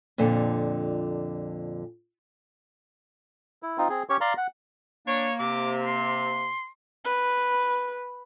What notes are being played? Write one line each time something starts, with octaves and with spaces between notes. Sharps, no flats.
F2 A#2 D3 A4
E4
C4 D#4 F4
C4 G#4
C#4 G4 C#5 C#6
D5 F5 A#5 C6
F#5
A#3 D4 C#5
C3 D6
C6
B4